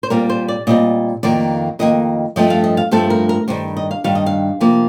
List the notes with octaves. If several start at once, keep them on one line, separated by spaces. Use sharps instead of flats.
C5
A#2 G3 C4 A#4
C5
D5
A#2 G3 C4 D#5
F2 D#3 A#3 D5
F2 D#3 A#3 D#5
G2 F3 A3 C4 D#5
F5
D#5
F5
G2 F3 A3 C4 A4
A#4
A#4
G2 D#3 G3 C5
D#5
F5
G2 D#3 G3 F5
D#5
F5
C3 F3 A#3